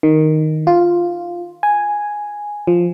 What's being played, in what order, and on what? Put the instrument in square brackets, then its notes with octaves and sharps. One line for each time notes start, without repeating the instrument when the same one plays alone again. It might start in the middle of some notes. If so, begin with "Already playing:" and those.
[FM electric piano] D#3
F4
G#5
F3